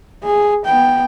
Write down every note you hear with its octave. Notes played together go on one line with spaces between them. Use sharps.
G#4
B3 G5